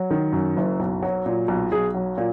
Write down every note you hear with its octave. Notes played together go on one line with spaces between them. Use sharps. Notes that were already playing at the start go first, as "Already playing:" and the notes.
Already playing: F#3
D#3
F#2
F#1
B1
F#3
A#2
B1
B1 G#4
F#3
A#2